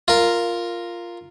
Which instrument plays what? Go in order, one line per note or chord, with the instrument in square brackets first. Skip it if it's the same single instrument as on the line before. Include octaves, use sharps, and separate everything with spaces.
[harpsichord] F4 A#4